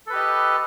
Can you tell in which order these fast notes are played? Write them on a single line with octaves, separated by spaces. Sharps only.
A4 B4 G4 D#5